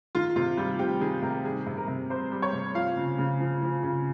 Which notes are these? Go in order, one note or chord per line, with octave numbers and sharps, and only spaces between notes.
D#3 F4
C3 F4
G3 F4
C3 G4
D#3 G#4
C3 A#4
G3 G#4
C3
A#4
C3
G3 C5
G3
C#5
C3
F3 F5
C#3
C#3
F3
F3
C#3